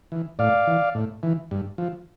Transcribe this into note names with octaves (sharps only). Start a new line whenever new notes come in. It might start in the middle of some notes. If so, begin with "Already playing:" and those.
E3
A2 D5 F5
E3
A2
E3
G2
F3